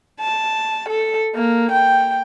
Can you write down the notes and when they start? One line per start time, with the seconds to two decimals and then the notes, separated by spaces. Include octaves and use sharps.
0.20 A5
0.89 A4
1.36 A#3
1.72 G5